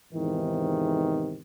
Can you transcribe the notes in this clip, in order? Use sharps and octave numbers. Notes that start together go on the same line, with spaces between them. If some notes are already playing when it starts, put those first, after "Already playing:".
E2 G#2 C3 D#3 E3